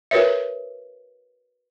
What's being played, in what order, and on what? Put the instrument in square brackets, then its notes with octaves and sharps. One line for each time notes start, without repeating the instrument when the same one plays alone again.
[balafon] F#4 A#4 B4 C#5 E5